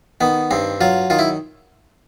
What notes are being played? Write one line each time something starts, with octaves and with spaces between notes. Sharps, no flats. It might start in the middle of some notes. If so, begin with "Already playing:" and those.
D#3 B3
G2 C4
F#3 F4
D#3 F4
E4